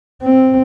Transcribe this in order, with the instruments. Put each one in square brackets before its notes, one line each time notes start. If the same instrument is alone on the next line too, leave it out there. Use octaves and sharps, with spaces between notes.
[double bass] C4